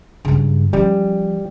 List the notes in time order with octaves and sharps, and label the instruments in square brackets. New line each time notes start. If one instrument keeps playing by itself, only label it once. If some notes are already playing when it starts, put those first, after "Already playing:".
[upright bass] G2 C#3
[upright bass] F3 C#4 [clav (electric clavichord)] G3